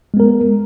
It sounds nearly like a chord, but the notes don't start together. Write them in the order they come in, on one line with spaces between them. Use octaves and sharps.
G#3 B3 A#4